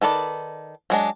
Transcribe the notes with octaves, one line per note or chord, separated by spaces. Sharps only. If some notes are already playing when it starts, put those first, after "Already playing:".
D#3 A4 B4 D5
F#3 G#3 D4